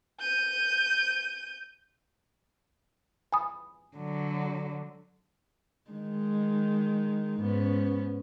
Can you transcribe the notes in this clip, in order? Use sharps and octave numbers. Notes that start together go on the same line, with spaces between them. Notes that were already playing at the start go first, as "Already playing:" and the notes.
G6 D#7
G#5 B5 D#6
D3 F#3
D#3 G#3 D#4
G#2 B3 C#4